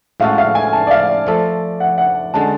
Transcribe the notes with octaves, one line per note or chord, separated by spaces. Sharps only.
A2 G#3 C#4 F#4 A4 F5
F5
G#5
A5
D5
F5
D5
F3 A3 F4 A4
F#5
F#5
D3 G#3 C#4 F#4 A5